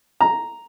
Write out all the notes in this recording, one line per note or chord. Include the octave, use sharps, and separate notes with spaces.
A#5